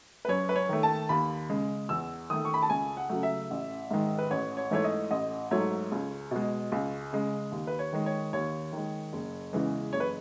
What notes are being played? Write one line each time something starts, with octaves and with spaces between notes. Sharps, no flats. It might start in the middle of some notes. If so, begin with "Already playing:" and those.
B4
F#2 C#5
B4
C#5
D#3 A3
A5
D#2 B5
C#3 G#3
E2 E6
D#3 A3 D#6
C#6
B5
A5
C#2 G#5
F#5
C#3 F#3 A3
E5
A1
G#2 D#3 G#3
B4
A1 C#5
C#5
G#2 E3 A3 C#5
D#5
A1 D#5
G#2 F#3 A3 C#5
C#2
B2 G#3
C#2
C#3 G#3
D#2
B4
C#5
D#3 G#3
C#5
D#2 C#5
D#3 G#3
F#1
E2 C#3 E3 G#3
F#1 C#5
B4